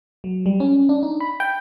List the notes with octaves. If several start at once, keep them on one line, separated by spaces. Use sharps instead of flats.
F#3
G3
C#4
D4
D#4
B5
G5